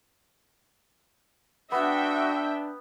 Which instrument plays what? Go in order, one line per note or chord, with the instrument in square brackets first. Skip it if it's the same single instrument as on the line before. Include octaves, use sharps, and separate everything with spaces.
[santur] B3 [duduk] D4 [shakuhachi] F#4 [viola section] E5 G5